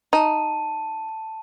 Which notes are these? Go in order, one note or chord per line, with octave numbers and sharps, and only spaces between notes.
D#4 A5 D#7